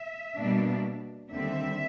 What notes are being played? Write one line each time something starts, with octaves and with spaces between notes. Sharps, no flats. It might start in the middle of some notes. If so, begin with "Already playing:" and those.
Already playing: E5
B2 G3 A#3 D4
D#2 D3 G3 C4 E5